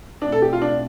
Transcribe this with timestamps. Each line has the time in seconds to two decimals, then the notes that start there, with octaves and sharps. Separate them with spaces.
0.22 B2 A3 C4 D4
0.32 A4
0.42 G4
0.53 F4
0.62 D4